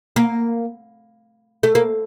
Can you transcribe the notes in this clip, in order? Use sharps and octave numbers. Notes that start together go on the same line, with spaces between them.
A#3
A3
A#3